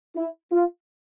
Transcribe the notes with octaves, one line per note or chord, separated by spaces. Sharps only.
E4
F4